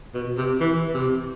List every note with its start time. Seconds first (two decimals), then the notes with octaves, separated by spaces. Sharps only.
0.14 B2
0.37 C3
0.60 E3
0.94 C3